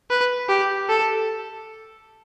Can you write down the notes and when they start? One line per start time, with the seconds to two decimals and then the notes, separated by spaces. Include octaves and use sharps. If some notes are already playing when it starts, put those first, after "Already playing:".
0.10 B4
0.49 G4
0.89 A4